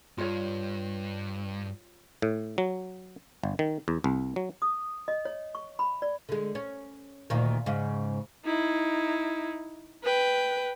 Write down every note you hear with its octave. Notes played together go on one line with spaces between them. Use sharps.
G2 F4 C#5
A2
F#3
G1
D#3
E2
C2
F#3
D#6
D#5
C#5
C#6
B5
D5
D3 G#3
C#4
D2 A#2 D#3
G#2 C#3
D#4 E4
B4 G5